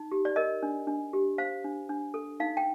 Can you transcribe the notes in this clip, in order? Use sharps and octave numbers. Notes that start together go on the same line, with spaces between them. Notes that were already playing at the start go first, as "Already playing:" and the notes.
Already playing: D#4
G4
D5
A#4 D#5
D4
D4
G4
C5 F5
D4
D4
A4
D#4 F5
G5